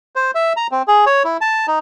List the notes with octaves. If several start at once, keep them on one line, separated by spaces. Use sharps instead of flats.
C5
E5
A#5
C4
G#4
C#5
E4
A5
D#4